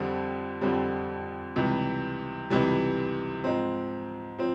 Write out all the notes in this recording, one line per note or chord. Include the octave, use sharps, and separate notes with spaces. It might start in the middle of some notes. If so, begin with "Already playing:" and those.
Already playing: F2 D3 G3 C4
F2 D3 G3 C4
C#2 C3 E3 G3
C#2 C3 E3 G3
G#2 F3 G#3 C4
F3 C4